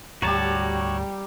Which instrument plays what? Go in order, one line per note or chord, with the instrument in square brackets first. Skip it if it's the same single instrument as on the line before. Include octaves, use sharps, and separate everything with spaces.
[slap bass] D2 G#2 [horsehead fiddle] G3 [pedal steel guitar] F#4 C#5 A5 [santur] G4 A#5